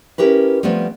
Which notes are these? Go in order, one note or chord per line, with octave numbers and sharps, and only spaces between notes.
C#4 E4 G4 A#4 B4
F3 G3 A3 B3 C4